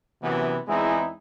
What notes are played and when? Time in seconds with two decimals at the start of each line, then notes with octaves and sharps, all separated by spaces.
0.22 F#2 C3 E3 B3
0.67 E2 G#3 C4 D#4 E4 G#4